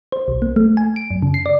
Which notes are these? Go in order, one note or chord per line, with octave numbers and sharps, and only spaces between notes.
C5
B1
A#3
A3
G#5
D7
F#2
C#3
C7
D5